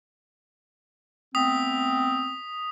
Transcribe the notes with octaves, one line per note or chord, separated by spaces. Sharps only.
A3 B3 C4 D#6 B6